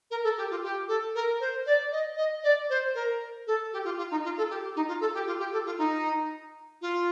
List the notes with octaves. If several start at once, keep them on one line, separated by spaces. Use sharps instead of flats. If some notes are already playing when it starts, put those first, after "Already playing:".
A#4
A4
G4
F4
G4
A4
A#4
C5
D5
D#5
D#5
D5
C5
A#4
A4
G4
F4
F4
D#4
F4
A4
G4
D#4
F4
A4
G4
F4
G4
A4
F4
D#4
F4